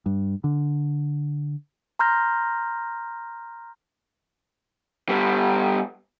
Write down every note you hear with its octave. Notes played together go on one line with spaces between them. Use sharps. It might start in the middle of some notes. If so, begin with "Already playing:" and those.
G2
D3
A#5 C6 F6 G6 A#6
G3 B3